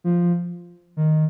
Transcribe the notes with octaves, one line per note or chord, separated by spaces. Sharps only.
F3
D#3